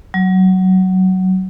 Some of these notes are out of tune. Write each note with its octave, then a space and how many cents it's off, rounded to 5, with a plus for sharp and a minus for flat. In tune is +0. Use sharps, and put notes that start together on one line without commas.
F#3 +15